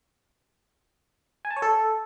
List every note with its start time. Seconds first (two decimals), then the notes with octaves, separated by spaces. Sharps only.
1.45 G#5
1.51 A5
1.56 C#5
1.62 A4